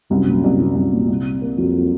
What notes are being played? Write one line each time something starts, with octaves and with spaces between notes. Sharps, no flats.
C2 F#2
A#2
C2
F#3
C2
A#2
C2
C3
A#3
F2 F#3